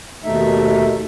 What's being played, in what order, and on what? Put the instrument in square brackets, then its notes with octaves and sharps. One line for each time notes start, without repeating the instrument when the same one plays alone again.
[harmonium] D#2 B2 A3 D#4 E5